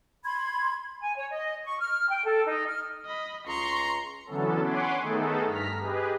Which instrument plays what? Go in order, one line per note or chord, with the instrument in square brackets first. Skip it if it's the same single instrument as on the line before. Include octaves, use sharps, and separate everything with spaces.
[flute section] B5 C6 G#6
G#5
C#5
D#5
C#6
F6
G5
A4
D#4
F6
[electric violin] D#5 B5
[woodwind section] C#2 A#5 [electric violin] C6 C#6
[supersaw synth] D3 E3 F#3 B3 C#4 A4
C#5 F#5 G#5 B5 C6 D6
D#3 A3 B3 D#4 G#4 A4
G2 A#5 F6 B6
G4 G#4 B4 D#5